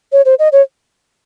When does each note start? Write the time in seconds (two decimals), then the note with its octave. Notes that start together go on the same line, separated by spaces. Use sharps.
0.12 C#5
0.25 C5
0.39 D#5
0.52 C#5